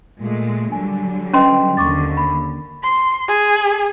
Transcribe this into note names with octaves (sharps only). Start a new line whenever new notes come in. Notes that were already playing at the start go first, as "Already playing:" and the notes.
A#2 G#3 A3
D3 F#3 G3 G#5
C#4 B4 D#5 G5 C6
D#2 D3 C#6 D6 A6
B5
C6
G#4